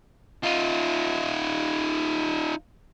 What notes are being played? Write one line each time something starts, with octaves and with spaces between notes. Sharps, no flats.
D#4 F4